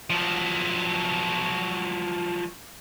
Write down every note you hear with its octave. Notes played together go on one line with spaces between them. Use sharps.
F3 F#3